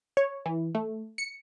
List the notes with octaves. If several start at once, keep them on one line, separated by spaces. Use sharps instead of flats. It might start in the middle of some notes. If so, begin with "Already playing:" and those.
C#5
E3
A3
C#7